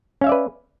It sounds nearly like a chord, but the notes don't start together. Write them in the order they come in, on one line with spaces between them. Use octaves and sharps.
C#4 F5 E5 D5 B4